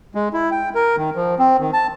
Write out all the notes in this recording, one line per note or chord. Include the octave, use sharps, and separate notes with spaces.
G#3
E4
G5
A#4
D#3
F3
C4
D#3
A5